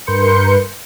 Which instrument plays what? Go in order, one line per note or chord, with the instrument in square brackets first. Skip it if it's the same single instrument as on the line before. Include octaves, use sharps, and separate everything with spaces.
[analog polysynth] G2 A#4 B4 C6 G6 C#7